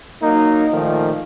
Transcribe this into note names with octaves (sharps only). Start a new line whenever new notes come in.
F#3 A#3 D#4
A#2 D#3 F3 A3